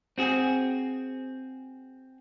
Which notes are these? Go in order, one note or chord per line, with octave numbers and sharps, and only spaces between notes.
C4 F#4 G#4